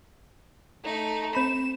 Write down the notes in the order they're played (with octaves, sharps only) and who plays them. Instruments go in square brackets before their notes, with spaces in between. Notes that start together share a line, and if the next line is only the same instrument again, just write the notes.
[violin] A3 D#4
[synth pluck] C4 B5 [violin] E7